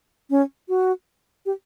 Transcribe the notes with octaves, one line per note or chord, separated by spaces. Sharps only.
C#4
F#4
G4